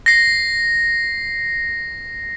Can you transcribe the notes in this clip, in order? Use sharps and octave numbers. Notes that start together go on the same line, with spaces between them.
A#6 C7